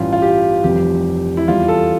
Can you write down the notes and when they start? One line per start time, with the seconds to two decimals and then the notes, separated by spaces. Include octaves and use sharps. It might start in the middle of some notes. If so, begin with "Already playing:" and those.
Already playing: A1 G2 E3 G3 F4
0.13 F4
0.22 G4
0.64 F1 F2 E3 G3 G4
1.37 E4
1.48 E2 E3 G3 F4
1.68 A4